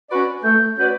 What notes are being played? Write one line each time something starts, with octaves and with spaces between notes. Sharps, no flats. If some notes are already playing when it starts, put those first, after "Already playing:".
C#4 F#4 B4 D5
A3 G6
C#4 F#4 B4 D5 G6